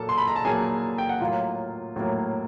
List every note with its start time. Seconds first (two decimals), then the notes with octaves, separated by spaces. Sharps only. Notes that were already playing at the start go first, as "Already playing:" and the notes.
Already playing: A#2 F#3 A#3 A4 A5
0.09 C6
0.18 B5
0.28 A#5
0.36 A5
0.45 A#2 F#3 A#3 G#4 G#5
0.98 G5
1.09 F#5
1.21 A2 F#3 A#3 F4 F5
1.96 A2 F#3 A#3